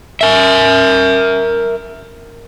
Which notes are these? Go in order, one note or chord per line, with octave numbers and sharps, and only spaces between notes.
A#4 E5